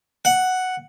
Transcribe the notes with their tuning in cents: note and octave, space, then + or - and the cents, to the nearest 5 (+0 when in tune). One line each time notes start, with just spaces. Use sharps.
F#5 +0